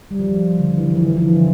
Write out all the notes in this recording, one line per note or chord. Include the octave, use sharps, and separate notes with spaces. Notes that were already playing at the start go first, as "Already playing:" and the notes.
G3
F3
D3
E3
E3
F3
F3
E3
D3